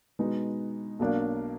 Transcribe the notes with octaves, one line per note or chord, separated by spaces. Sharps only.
B2 G#3 B3 D#4
B1 B2 F#3 A#3 D4